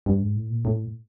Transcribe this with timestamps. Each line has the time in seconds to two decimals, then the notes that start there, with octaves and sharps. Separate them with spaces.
0.06 G2
0.21 G#2
0.36 A2
0.50 A#2
0.65 A2